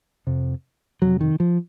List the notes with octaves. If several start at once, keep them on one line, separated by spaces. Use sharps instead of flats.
F2 C3
F2 C3 F#3
D#3
F3